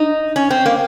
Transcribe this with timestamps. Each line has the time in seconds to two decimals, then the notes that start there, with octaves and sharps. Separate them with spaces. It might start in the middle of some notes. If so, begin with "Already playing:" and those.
Already playing: D#4
0.36 C#4
0.50 C4
0.66 A#3